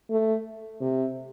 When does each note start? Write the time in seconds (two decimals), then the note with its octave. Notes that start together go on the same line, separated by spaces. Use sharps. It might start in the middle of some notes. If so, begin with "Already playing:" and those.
0.10 A3
0.81 C3